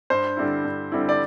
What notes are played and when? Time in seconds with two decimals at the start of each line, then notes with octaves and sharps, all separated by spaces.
0.10 G2 C5
0.37 D3 G3 C4 E4
0.64 G2
0.92 D3 G3 C4 E4
1.09 D5